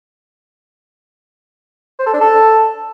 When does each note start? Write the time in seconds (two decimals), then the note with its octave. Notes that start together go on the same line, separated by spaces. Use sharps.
1.99 C5
2.06 A4
2.13 D4
2.21 A4